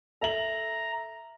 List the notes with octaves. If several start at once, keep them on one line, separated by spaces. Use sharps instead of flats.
A4 E5 A#5 F#7